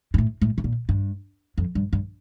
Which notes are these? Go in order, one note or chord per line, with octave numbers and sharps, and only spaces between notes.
G2
A2
A2
C3
A#2
G2
F2
G2
G2